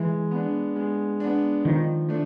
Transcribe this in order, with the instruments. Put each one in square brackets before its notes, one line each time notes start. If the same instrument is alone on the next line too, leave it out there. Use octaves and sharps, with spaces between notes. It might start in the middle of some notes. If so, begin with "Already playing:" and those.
Already playing: [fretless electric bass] E3 [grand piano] G#3
[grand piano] B3 D4
G#3
B3 D4
[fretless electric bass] D#3 [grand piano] F3
[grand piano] A3 D4